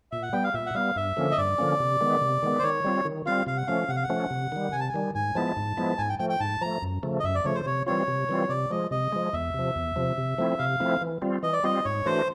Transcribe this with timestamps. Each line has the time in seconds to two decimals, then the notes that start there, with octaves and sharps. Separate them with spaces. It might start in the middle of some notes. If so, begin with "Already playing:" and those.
0.12 A#2 E5
0.23 F#5
0.33 G3 B3 G5
0.44 F5
0.54 A#2 E5
0.66 F#5
0.75 G3 B3 F5
0.96 G2 E5
1.17 D3 F3 A#3 C#4
1.31 D#5
1.38 G2 D5
1.58 D3 F3 A#3 C#4
1.80 C3
2.01 D#3 G#3 B3
2.21 C3
2.42 D#3 G#3 B3
2.59 C5
2.63 D#3 C#5
2.84 G3 C4 F4
3.05 D#3
3.26 G3 C4 F4 F5
3.46 C3 F5
3.57 F#5
3.67 F3 A3 C#4 F5
3.89 C3 F#5
3.96 F5
4.03 F#5
4.10 F3 A3 C#4
4.31 C3
4.52 D#3 G3
4.72 C3 G#5
4.80 A5
4.89 G#5
4.94 D#3 G3
5.15 G#2 G#5
5.35 F3 G#3 B3 E4 A5
5.56 G#2
5.77 F3 G#3 B3 E4
5.98 G#2 G#5
6.09 G5
6.19 F3 A3 G5
6.30 G5
6.40 G#2 A5
6.61 F3 A3 A#5
6.82 F#2
7.03 C#3 F3 A3
7.20 D#5
7.24 F#2 E5
7.35 D5
7.44 C#3 F3 A3 C#5
7.55 C5
7.66 C3 C#5
7.87 E3 G3 C4 F4 C#5
8.08 C3
8.29 E3 G3 C4 F4
8.49 C3 D5
8.70 F3 G#3 D#5
8.91 C3 D#5
9.12 F3 G#3
9.33 E2 E5
9.54 C3 F3
9.75 E2
9.96 C3 F3
10.18 C3
10.38 F3 A3 C4 E4
10.58 C3 F5
10.80 F3 A3 C4 E4
11.01 E3
11.22 G3 C4 F4
11.43 E3 D#5
11.53 D5
11.63 G3 C4 F4 D#5
11.85 G#2 C#5
12.06 E3 A3 D4 F#4 C5